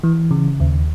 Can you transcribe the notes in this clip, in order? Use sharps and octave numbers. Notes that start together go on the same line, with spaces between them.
E3
C#3
D#2